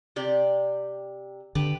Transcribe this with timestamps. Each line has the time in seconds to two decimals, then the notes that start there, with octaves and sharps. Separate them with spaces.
0.16 C3 G4 D5
1.55 D3 G4 B4